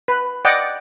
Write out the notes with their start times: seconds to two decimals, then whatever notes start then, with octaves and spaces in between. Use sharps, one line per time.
0.08 B4
0.45 D5 D#5 F#5 G5 D6